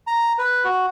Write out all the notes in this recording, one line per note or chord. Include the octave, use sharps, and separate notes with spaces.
A#5
B4
F#4